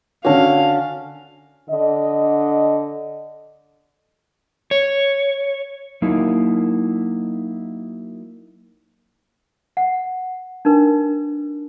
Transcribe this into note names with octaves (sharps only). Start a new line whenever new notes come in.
D3 C#4 F#4 F5 A5
D3 D#5
C#5
F#3 A#3 D#4 E4
F#5
D4 D#4 A#4 B4